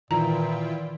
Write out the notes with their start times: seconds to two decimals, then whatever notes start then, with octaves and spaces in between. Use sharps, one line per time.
0.11 A#2 D#3 E3 E4 F4 G5 A#5